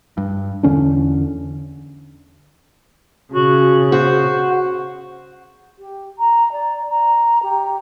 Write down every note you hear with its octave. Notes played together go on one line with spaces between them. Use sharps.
G2
E2 D3 C#4 D4
C#3 F#4
F#4 C5
G4
A#5
D5
A#5
G4